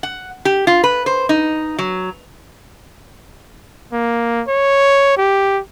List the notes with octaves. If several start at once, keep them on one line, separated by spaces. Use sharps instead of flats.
F#5
G4
F4
B4
C5
D#4
F#3
A#3
C#5
G4